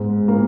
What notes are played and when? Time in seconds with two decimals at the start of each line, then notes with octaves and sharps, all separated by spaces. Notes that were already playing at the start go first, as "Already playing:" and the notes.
Already playing: G#2 G#3
0.28 A#2 A#3